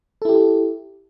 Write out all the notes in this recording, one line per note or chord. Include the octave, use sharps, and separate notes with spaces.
E4 G4 A4